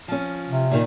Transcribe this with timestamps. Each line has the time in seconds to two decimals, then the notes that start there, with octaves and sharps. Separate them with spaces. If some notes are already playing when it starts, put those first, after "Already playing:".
0.08 F3 C#4
0.48 C3
0.71 A#2 D#3 D#4